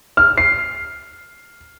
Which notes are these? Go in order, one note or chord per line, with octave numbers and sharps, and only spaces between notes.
F6
C7